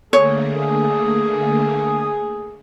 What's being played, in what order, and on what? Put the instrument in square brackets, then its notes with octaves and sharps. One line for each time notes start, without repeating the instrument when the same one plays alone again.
[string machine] D3 A3 A#3 [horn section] G#4 [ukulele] C#5